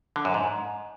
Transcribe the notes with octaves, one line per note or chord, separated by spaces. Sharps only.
D3
F#2
G#2